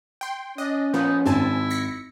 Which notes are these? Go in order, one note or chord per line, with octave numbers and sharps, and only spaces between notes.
G5 C6
C#4 D4 D#5
A#2 F3 B3 D#4
G#1 C4 E4 G#5 A5
A#6 B6 C#7